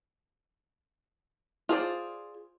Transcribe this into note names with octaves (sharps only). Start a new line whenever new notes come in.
F4 G#4 C5 D5